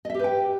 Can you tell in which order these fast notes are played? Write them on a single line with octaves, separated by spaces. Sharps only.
D#5 E5 G4 B4 G5